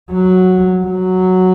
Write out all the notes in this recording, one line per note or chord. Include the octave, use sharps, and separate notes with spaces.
F#3
F#3